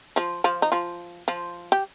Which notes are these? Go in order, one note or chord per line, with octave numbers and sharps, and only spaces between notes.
F3 F4
F3 F4
D#4
F3 F4
F3 F4
G4